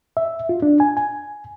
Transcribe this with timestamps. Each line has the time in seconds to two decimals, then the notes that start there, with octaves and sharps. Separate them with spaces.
0.17 E5
0.49 F4
0.62 D4
0.80 G#5
0.97 G#5